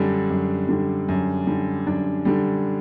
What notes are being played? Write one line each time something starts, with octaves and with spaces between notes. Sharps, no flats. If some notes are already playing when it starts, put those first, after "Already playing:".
Already playing: F#2 D3 G3 D4
F#2
D3 G3
F#2
D3 G3
F#2 D4
D3 G3